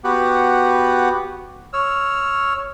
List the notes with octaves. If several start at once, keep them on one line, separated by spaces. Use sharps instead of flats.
B3 F#4 G4 F#5
C#5 E6 F6